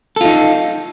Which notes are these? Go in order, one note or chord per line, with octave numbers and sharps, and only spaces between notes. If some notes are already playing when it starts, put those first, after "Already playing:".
D#4 F4 A4